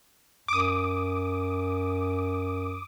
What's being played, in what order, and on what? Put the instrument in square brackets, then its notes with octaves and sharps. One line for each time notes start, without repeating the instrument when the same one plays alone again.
[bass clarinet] F#2 [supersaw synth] D6 D#6